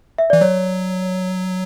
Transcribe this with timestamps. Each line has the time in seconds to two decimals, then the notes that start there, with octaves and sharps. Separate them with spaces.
0.18 E5
0.30 E3 D5
0.41 F#3 C#5